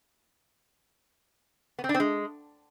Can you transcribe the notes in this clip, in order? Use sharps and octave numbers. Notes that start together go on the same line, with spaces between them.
B3
C4
D4
C4
G#3